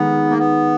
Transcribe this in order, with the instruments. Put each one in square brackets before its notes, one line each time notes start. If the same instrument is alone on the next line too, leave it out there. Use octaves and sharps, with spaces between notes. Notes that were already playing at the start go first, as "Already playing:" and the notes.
Already playing: [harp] D#3 G#3 D#4 [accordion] B3
[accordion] A#3
B3